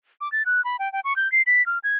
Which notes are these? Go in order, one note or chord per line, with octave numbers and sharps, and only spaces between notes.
D6
A6
F#6
B5
G5
G5
C#6
G6
C7
B6
F6
G#6